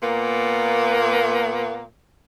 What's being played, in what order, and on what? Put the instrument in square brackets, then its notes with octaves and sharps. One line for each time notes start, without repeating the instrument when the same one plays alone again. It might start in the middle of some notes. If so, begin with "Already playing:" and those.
[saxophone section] A#2 A#3 B3